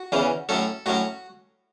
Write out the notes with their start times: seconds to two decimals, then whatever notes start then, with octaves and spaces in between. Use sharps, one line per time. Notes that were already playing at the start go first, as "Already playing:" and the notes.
Already playing: F#4
0.12 E2 C#3 E3 C#4
0.49 A2 F#3 C#4 A4
0.86 A2 F#3 C#4 F#4